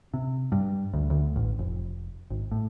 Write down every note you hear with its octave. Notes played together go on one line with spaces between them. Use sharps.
C3
G2
D2
D2
A1
F1
G#1
A2